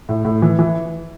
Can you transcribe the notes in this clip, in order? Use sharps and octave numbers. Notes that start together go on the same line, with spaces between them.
A2
A2
E3
E3